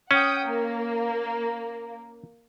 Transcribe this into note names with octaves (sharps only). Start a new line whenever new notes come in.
C#4 F#5 G5 D#6
A#3